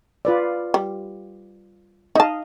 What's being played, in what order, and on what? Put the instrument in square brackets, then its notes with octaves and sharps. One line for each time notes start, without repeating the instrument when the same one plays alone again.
[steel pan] F4 B4 D5
[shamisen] G3
[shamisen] D#4 A5 [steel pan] D#5 F5